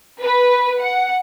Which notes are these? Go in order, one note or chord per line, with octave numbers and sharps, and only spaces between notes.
B4
F#5